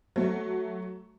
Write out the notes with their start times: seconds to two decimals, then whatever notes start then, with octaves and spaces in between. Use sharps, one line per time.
0.16 F#3 A3